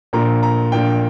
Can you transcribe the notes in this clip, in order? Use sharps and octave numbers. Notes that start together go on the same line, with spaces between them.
A#1 A#2 A#3 A#5
A#5
A#1 A#2 A#3 G5